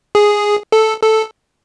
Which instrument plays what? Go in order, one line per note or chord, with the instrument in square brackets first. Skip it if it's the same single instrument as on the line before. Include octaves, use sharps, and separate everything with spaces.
[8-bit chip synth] G#4
A4
A4